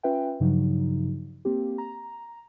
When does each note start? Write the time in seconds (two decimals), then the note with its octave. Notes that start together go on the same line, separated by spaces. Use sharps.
0.03 C#4 F4 B4 E5 G5
0.40 G2 C#3 F3 F#3 D#4
1.45 A#3 C4 G4
1.78 A#5